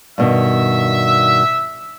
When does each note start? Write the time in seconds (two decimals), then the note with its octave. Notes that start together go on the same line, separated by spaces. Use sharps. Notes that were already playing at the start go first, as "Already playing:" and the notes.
0.18 G2 B2 D#3 E5